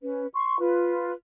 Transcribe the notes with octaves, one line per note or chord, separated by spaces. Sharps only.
C#4 B4
C6 C#6
F4 B4